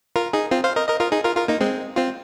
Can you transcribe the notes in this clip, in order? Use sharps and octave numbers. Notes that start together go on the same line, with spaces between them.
F4 A#4
D#4 G#4
C4 F4
C5 F5
A#4 D#5
A#4 D#5
F4 A#4
D#4 G#4
F4 A#4
F4 A#4
A#3 D#4
G#3 C4
C4 F4